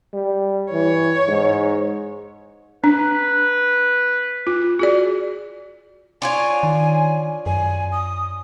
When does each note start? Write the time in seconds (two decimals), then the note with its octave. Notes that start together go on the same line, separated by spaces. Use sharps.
0.13 G3
0.72 E3 C#5
1.28 G#2
2.84 D4 B4
4.47 F4
4.79 F#4 G#4 D5
6.22 D4 F4 C#5 G#5
6.63 D#3
7.46 F#2 G#5
7.92 D#6